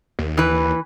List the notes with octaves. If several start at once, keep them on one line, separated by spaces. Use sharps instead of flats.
D#2
E3 B4